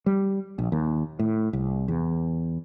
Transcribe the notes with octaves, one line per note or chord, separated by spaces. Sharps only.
G3
A#1
D#2
A2
C2
E2